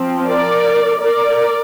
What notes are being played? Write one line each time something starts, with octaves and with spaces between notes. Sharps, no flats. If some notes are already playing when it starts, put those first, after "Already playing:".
Already playing: F3 C4
A#4 D5
A#4 D5